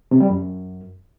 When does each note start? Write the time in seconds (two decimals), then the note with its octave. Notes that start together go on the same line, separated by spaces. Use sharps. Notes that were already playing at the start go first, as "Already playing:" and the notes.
0.11 C3
0.20 G3
0.29 F#2